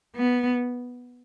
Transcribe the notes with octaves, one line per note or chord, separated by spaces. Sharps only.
B3